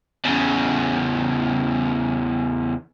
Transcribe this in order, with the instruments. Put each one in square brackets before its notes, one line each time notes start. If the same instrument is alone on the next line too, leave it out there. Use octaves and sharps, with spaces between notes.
[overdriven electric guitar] E2 C#3